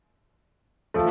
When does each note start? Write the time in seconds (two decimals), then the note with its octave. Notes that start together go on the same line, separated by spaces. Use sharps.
0.94 F3 A3